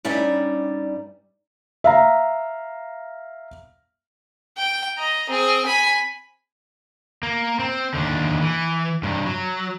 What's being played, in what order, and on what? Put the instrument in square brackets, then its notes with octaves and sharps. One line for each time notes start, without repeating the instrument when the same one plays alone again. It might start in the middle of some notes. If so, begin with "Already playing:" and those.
[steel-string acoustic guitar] G2 G3 C#4 D#4 D5 E5
[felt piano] E5 F5 A#5
[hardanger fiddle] G5
D#5 A#5
C4 G#4
G#5 B5
[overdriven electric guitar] A#3
C4
D#2 D3
E3
G2 C3
F#3